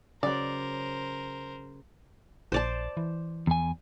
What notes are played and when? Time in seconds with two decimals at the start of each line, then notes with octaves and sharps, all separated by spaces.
0.23 C#3 F#3 A#4 C5 D5
2.52 A#1 C5 D5 A5
2.97 E3
3.47 E2 G#5